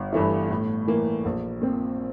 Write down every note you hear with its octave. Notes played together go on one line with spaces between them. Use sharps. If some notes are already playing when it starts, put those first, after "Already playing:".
Already playing: G1
G2 E3 A3 E4
A2
E3 A#3
A#1
A#2 F3 C4